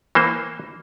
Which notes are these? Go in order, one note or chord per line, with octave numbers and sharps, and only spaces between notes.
E3 A#3 C5